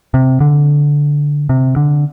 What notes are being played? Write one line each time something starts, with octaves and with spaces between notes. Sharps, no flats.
C3
D3
C3
D3